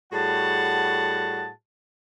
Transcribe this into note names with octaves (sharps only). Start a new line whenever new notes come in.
A2 G3 F#4 G#4 F#5 A5